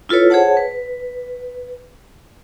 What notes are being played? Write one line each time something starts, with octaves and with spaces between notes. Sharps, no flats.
E4 F4 A4 B4 C#5
G#4 C5 C#5 F#5 A5
B4